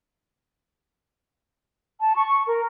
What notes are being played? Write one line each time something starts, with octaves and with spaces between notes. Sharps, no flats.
A5
C#6
A#4